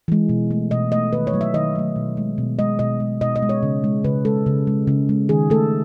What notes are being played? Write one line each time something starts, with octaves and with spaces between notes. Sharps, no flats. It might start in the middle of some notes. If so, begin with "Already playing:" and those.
E3 G#3
B2
A3
B2 D#5
A3 D#5
D#3 B4
C#5
F#3 A3
E5
D#3 D#5
F#3 A3
B2
G#3
B2
G#3 D#5
B2 D#5
G#3
B2 D#5
D#5
G#3
C#5
C#3
G#3
C#3 B4
G#3 A4
C#3
G#3
C#3
G#3
D#3 G#4
A3 A4